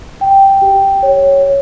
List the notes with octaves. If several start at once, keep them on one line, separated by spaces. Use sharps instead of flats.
G5
G4
C#5
C#5